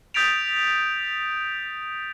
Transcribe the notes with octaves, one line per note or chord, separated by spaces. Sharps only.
D#6 G6 A6 B6 D7 F7